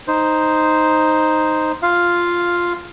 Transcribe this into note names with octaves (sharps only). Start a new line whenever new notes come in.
D#4 C5
F4 F5